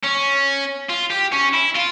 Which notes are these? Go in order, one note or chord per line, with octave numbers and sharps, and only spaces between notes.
C#4
F4
G4
C#4
E4
F4